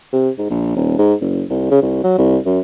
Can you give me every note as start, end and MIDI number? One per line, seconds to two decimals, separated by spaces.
0.13 0.29 48
0.38 0.47 44
0.50 0.74 34
0.76 0.98 27
0.99 1.14 44
1.21 1.43 30
1.50 1.68 36
1.71 1.81 49
1.82 1.99 36
2.04 2.16 54
2.18 2.38 36
2.46 2.60 42